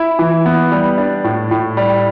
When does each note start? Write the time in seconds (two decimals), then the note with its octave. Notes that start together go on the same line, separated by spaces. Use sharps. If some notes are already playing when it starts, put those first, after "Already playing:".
Already playing: E4
0.19 E3
0.46 B3
0.72 G3
0.98 D4
1.24 A2
1.51 A2
1.77 G3